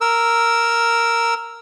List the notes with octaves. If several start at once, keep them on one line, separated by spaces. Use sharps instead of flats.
A#4 E6